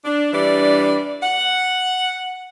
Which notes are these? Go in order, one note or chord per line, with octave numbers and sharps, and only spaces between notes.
D4
E3 G3 D4 D5
F#5